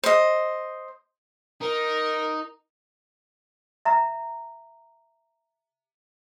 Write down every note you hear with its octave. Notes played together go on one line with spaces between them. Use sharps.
C5 D#5
D#4 A#4
E5 A#5